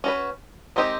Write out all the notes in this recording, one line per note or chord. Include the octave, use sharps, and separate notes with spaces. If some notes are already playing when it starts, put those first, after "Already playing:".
C#4 F#4 B4
D#3 G#3 C4 D#4 G4